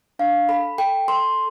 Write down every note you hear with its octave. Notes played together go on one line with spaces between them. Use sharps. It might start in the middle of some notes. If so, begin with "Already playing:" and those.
D4 F5
A4 B5
A4 G5
A4 C6